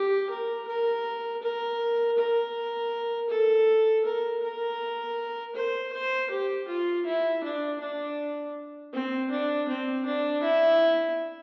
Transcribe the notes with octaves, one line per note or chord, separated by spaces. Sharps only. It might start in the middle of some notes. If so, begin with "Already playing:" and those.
Already playing: G4
A#4
A#4
A#4
A#4
A4
A#4
A#4
C5
C5
G4
F4
E4
D4
D4
C4
D4
C4
D4
E4